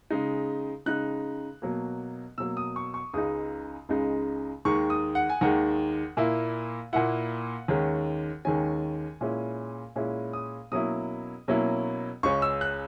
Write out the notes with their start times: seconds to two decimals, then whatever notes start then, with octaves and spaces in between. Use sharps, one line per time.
0.10 C#3 G#3 D#4
0.86 C#3 G#3 D#4 F#6
1.62 B2 F#3 A#3
2.38 B2 F#3 A#3 E6
2.57 D#6
2.76 C#6
2.94 C#6
3.14 C#2 C#3 G#3 D#4 D#6
3.89 C#2 C#3 G#3 D#4
4.65 D#2 D#3 G#3 C#6
4.90 D#6
5.15 F#5
5.30 G#5
5.41 D#2 D#3 G#3 F#5
6.17 A#2 A#3 E4
6.93 A#2 A#3 E4 F#5
7.68 D#2 D#3 G#3 C#4
8.45 D#2 D#3 G#3 C#4 G#5
9.21 A#2 G#3 C#4 E4
9.96 A#2 G#3 C#4 E4
10.33 D#6
10.72 B2 F#3 A#3 C#4 E4 D#6
11.48 B2 F#3 A#3 C#4 E4
12.23 C#2 C#3 G#3 C#4 C#6
12.42 E6
12.61 F#6